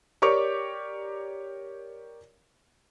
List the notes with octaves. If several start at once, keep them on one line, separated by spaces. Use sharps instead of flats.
G4 A#4 C#5 D5 C#6 D6